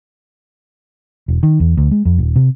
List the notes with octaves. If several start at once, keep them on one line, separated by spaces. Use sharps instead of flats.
E1
D#3
E2
D2
G#3
F2
D#1
C3